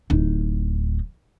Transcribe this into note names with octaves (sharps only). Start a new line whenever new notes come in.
D1 D#4